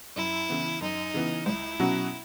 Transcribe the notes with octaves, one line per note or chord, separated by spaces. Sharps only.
F#2 E4
C#3 E3 B3
F#2 D#4
C#3 E3 B3
C#2 E4
B2 F#3 C#4 F#4